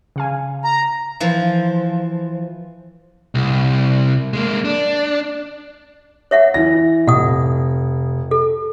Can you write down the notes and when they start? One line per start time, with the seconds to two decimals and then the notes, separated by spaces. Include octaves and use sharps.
0.16 C#3 F5 G#5
0.64 A#5
1.20 E3 F3
3.35 C2
4.34 G#3 A#3
4.65 D4
6.31 C#5 E5 F#5
6.54 E3 A#6
7.08 F1 F#5 D#6
8.31 A4